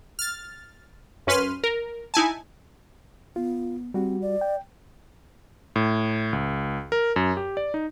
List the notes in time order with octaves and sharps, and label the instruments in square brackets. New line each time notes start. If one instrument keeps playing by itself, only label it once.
[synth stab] F6 A6
F#2 C#4 B4 C6 F6 D#7
A#4
D#4 E4 G#5 A5
[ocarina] B3 [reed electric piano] F4
[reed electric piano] G3 F#4 [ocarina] C4
[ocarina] D5
[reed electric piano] G5
[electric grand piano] A2
C#2
A#4
F#2
G4
D5
D#4